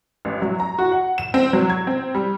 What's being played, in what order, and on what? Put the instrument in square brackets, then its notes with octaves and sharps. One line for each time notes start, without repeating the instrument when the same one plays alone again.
[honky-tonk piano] A1
F#3
A#5
F#4
F#5
E7
C4
F#3
G#6
C4
G3